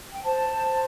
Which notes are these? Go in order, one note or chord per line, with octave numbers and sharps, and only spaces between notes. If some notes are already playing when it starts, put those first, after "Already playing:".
G5
C5 A5
C5